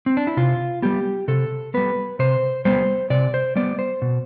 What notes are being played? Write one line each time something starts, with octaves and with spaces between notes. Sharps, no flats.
C4
D4
E4
C3 F4
G3 B3 G4
C3 A4
G3 B3 B4
C3 C5
G3 B3 C5
C3 D5
C5
G3 B3 D5
C5
B2